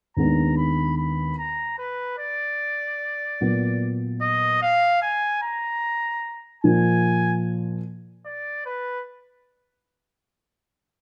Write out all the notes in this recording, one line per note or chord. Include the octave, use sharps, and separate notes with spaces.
D#2 D#3 G#3 B3 D4 A#5
B5
B5
A#5
B4
D5
A#2 F#3 B3
D#5
F5
G#5
A#5
A#2 F3 A#3 G#5
D5
B4